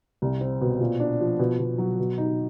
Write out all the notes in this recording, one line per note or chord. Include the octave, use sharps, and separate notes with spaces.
C2
C4
B2
A#2
D4
F3
B2
B2
F#3
B2
D#4